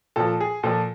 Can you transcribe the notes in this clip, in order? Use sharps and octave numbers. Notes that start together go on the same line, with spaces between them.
A#2 F3 A4
G#4
A#2 F3 A4